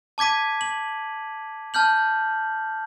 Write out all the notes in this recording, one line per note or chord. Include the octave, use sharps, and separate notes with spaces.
A5 D6 G#6 B6 D#7
F#7
A5 F6 G6 F#7